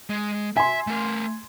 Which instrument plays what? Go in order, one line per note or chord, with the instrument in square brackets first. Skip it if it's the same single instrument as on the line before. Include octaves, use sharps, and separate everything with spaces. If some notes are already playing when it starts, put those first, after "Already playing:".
[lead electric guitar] G#3
[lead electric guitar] E5 [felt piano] G#5 C6
[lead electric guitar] A3 A#4